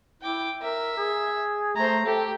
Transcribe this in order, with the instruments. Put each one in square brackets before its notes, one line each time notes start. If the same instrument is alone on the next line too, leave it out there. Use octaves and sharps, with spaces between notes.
[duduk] E4 [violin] G5 D6
[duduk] A#4 [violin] E5
[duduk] G#4
[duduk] A3 [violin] C5 A#5
[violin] G4 [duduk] A4